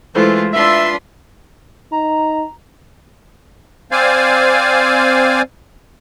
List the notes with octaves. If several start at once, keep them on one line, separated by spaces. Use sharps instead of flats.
E3 G#3 A3 E4 F4 A4 C5
D4 F4 B4 E5 C6
D#4 A#5
C4 C5 D5 F5 G#5